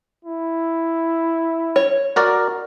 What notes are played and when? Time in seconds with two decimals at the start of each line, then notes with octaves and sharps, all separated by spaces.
0.25 E4
1.76 C#5
2.16 F#4 A#4 D5